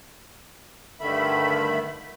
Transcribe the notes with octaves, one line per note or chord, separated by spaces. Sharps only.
G2 D3 D#3 A3 E5 B5